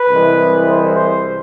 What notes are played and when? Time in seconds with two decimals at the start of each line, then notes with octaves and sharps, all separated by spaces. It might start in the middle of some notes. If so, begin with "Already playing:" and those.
Already playing: B4
0.10 C2 C3 E3 G#3
0.66 C5
0.95 C5